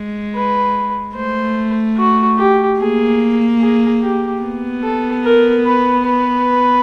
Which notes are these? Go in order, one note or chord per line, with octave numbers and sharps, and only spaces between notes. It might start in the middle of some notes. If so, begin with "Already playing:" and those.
Already playing: G#3
B4
A3 C5
F#4
G4
A#3 G#4
G#4
G4
B3
A4
A#4
B4
B4